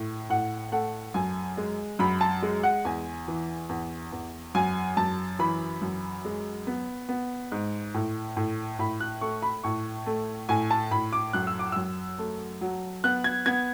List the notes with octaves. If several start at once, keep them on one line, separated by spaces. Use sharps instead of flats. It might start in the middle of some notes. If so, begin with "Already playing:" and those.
Already playing: A2
A2 F#5
A3 F#5
F#2 G#5
G#3
F#2 B5
A5
G#3
F#5
E2 G#5
E3
E2
E2
F#2 G#5
F#2 A5
E3 B5
F#2
G#3
B3
B3
G#2
A2
A2
A2 B5
F#6
A3 C#6
B5
A2 C#6
A3
A2 G#5
A5
A2 B5
D6
F#2 F#6
E6
D6
F#2 E6
A3
F#3
B3 F#6
G#6
B3 G#6